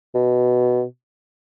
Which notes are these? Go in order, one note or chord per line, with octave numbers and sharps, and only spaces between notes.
B2